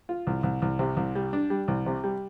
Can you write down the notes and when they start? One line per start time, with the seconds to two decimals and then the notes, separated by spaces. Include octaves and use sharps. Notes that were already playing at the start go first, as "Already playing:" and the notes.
0.09 F4
0.27 C2
0.43 C2
0.62 C2
0.79 C3
0.97 C2
1.15 G3
1.33 D4
1.50 G3
1.68 C2
1.86 C3
2.04 G3